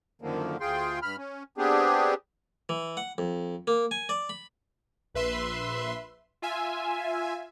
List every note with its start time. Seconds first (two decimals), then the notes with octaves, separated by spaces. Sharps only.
0.22 F#2 D3 D#3 F3 A#3
0.60 D2 F4 G#4 G5 C6
1.02 G2 B5 F6
1.17 C#4
1.58 B3 C4 D4 G4 G#4
2.69 E3
2.97 F#5
3.18 F2
3.67 A#3
3.91 G#5
4.09 D5
4.29 B5
5.15 A#1 B4 E5 C6
6.42 F4 E5 G#5